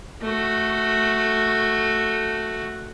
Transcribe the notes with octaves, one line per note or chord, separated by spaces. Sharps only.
A3 F#4